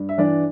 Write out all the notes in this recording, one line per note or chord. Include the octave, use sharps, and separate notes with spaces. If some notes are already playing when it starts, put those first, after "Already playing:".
Already playing: G2
E5
E3 D4 D5